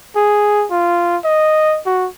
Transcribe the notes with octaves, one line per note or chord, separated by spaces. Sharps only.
G#4
F4
D#5
F#4